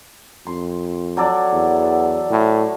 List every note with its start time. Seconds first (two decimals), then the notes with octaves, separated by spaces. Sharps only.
0.47 F2 C6
1.17 F#3 A4 D5
1.53 E2
2.30 A2